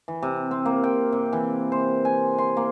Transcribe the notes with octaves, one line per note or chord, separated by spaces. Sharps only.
E3
C3
C4
A#3
G5
C3
E3
C5
G#5
C6
A#3